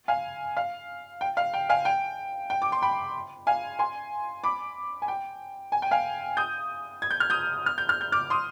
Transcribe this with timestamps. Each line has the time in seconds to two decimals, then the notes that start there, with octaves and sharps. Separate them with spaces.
0.08 F5 G#5
0.57 F5
1.21 G5
1.37 F5
1.54 G5
1.69 F5 G#5
1.85 G5
2.50 G5
2.62 D6
2.72 C6
2.82 G5 B5
3.47 F5 G#5
3.79 G#5 C6
4.44 B5 D6
5.02 G#5
5.08 G5
5.72 G#5
5.82 G5
5.91 F5 G#5
6.37 D#6 G6
7.02 G#6
7.11 G6
7.20 F6
7.30 D#6 G6
7.66 F6
7.78 G6
7.89 F6
8.01 G6
8.12 D6 F6
8.30 C6 D#6